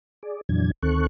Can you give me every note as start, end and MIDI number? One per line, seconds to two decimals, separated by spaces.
0.23 0.41 68
0.23 0.41 74
0.49 0.71 41
0.49 0.71 46
0.49 0.71 52
0.49 0.71 54
0.49 0.71 62
0.49 0.71 92
0.83 1.07 38
0.83 1.07 51
0.83 1.07 60
0.83 1.07 69
0.83 1.07 85
0.83 1.07 90